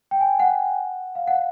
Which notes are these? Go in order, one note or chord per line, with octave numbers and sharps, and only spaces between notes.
G5
G#5
G5
F#5
F5
F#5